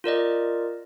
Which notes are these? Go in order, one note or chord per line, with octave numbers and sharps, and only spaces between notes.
F4 A#4 D5 D#5